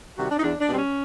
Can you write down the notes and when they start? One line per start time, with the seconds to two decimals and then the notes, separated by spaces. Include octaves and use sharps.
0.17 C3 D#3 G3 F#4
0.30 D4
0.38 D#4
0.43 E2 D4
0.60 D4
0.68 B2 G3 C4
0.77 C#4